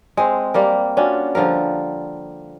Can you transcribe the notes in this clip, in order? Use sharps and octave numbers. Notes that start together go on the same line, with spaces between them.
G#3 C4
G3 A#3 A#4
C#4 D4 F4 F#4
D3 F3 G3 A#4